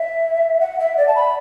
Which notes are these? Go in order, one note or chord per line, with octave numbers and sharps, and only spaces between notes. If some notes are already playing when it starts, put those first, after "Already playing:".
Already playing: E5
F#5
E5
D5
A5
B5